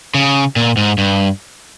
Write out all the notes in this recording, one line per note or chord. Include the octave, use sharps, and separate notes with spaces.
C#3
A#2
G#2
G2